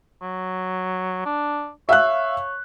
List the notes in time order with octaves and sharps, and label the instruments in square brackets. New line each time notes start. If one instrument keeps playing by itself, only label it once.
[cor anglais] F#3
D4
[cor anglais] C#5 [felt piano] E5 F5 F#6